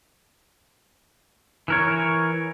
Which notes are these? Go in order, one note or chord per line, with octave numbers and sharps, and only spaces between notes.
E3 A#4 C#5